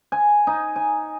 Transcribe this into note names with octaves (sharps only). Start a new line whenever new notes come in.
G#5
D#4
G#5